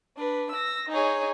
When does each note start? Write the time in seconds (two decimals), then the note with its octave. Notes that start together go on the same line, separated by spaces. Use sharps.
0.16 D4 B4
0.51 E6 A#6
0.88 D#4 G#4 C#5